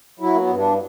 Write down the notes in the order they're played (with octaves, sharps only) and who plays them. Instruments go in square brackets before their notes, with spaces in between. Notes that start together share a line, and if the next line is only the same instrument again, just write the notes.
[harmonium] F#3 E4
A#3
B3
G2
D4